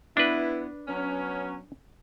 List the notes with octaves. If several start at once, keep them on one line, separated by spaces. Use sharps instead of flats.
B3 D4 E4 B4
F#3 B3 C#4